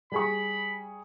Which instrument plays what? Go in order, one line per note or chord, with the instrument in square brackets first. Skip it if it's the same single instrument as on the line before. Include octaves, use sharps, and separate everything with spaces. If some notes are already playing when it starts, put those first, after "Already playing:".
[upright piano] G3 G#4 C#6 [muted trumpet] B5